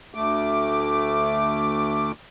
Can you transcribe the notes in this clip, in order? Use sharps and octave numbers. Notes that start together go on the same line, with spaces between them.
D2 A3 D6